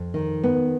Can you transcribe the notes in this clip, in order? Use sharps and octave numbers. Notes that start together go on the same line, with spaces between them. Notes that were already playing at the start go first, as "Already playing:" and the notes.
Already playing: F2
D#3
B3